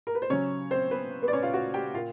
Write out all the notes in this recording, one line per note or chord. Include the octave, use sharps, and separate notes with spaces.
A#4
B4
C5
C#3 F#3 C#4 C#5
C4 C5
B3 B4
B3 B4
D5
C#4 C#5
F4 F5
F#4 F#5
G4 G5
A#2 F4 F5